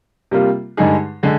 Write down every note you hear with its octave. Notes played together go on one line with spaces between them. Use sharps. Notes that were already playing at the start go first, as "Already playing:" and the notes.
C3 G3 A#3 F4
G2 D3 G#3 D#4 G#4
D3 G#3